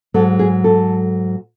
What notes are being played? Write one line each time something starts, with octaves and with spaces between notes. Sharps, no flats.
G#2 F#3 A4
G#4
A4